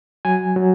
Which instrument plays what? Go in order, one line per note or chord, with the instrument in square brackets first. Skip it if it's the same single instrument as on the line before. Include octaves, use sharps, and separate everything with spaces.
[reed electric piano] F#3 G#5
F#3